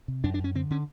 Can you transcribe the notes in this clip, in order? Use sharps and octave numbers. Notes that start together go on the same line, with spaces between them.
C3
F#2 D4
D4
F#2
C#4
D3 C4
D3 C#4